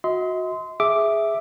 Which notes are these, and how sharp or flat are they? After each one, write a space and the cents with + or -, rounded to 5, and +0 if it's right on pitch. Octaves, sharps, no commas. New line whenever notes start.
F#4 -20 D#5 +40 C6 -20
G#4 +0 E5 +0 D6 +0